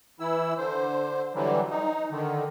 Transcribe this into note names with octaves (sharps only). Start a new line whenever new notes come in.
E3 E4 E6
D3 C5
D3 E3 F#3 G3
D#4
D3 D#3